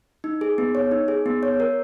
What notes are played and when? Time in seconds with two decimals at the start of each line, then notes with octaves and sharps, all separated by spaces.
0.24 D#4
0.41 G#4
0.58 B3
0.75 C#5
0.91 D#4
1.08 G#4
1.26 B3
1.43 C#5
1.60 A#4